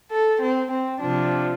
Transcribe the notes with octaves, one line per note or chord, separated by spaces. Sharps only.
A4
C4
C4
C3 F3 D4